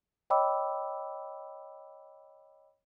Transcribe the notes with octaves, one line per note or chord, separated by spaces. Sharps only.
C#5 D#5 G5 B5 D6 E6